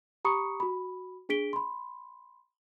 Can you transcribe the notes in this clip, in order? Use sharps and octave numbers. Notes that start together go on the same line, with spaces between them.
G4 A#5 B5 C#6 D#6 C#7
F#4 B5
D4 G#4 B6 D7 G7
B5 C6